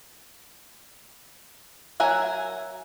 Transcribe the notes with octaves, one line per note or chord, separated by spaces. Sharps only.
F#3 A#4 E5 F#5 G#5